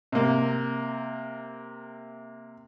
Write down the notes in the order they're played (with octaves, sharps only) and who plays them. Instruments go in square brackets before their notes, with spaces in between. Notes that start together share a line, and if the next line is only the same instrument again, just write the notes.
[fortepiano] C3 A#3